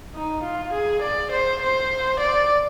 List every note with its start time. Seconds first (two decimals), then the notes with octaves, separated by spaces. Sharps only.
0.14 D#4
0.44 F4
0.73 G#4
1.03 D5
1.32 C5
1.62 C5
2.20 D5